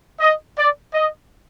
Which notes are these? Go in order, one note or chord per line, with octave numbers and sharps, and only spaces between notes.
D#5
D5
D#5